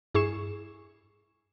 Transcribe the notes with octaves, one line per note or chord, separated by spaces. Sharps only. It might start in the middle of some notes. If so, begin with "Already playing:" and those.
G2 E4 G#4 C#6 C7 E7